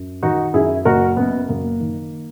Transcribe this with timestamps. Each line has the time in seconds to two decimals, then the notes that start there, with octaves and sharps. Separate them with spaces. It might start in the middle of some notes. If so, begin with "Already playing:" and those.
Already playing: F#2
0.23 D#3 D#4 F#4
0.54 F#2 E4 G#4
0.85 F#1 F#4 A#4
1.17 F#2 B3
1.48 F#1 A#3
1.80 D#3